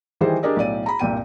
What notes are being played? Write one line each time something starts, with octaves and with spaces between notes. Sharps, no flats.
D#3 E3 G3 G4 G#4 C5
D4 G4 G#4 A#4 D5 D#5
B1 A2 D5 D#7
A#5 B5
C2 G2 A#2 G5 D#7